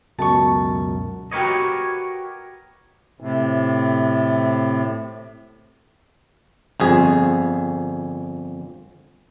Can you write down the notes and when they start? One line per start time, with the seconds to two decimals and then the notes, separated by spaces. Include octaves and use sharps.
0.19 C#2 F#2 B2 A5 C#6
1.32 F#4 G4 A#4 B4 C#5 D#5
3.21 A2 C3
6.80 G1 F2 G#4